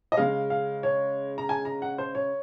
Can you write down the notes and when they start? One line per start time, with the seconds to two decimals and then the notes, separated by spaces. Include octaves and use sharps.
0.12 D#5
0.17 C#3 G#3 F5
0.50 F5
0.83 C#5
1.38 A#5
1.49 G#5
1.65 A#5
1.82 F#5
1.98 C5
2.15 C#5